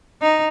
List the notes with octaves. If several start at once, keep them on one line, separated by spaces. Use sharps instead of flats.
D#4